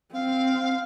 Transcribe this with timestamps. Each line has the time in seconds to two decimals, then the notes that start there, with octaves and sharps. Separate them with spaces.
0.14 C4 F5